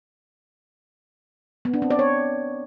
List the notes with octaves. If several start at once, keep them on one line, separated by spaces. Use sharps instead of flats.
B3
D4
C4
D5
C#5